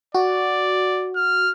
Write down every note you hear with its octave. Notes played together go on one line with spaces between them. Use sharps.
F#4 D5
F6